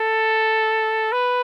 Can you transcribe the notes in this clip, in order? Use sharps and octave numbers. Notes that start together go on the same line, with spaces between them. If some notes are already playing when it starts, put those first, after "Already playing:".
Already playing: A4
B4